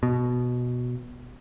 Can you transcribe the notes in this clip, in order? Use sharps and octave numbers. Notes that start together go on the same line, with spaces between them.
B2